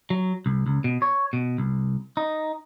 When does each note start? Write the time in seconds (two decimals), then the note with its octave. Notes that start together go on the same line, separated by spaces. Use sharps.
0.10 F#3
0.46 C2
0.67 C#2
0.84 B2
1.02 C#5
1.33 B2
1.58 C2
2.17 D#4